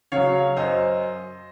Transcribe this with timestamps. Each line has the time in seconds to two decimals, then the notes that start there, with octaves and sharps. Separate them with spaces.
0.12 C#3 F#3 C#5 F5
0.57 F#2 C5 D#5